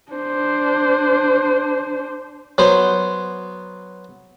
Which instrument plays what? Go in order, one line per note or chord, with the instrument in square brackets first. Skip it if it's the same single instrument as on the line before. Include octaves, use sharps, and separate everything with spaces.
[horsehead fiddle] D4 C5
[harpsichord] F#3 B3 C5